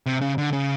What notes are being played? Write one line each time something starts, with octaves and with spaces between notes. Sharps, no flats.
C3
C#3
D3
C#3